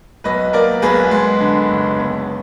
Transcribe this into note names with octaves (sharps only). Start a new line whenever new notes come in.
B1 B4 D#5
A#3 A#4 D5
B1 G#4 B4
G#3
D3
F#1
B3